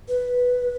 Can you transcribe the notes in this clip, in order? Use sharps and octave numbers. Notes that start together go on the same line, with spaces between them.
B4